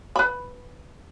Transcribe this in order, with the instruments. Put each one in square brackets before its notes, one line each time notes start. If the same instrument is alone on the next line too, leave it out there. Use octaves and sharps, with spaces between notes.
[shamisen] B4 B5